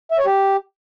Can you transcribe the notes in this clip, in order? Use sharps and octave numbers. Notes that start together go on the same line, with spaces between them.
E5
C#5
G4